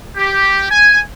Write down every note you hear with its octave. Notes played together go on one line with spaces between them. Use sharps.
G4
G#5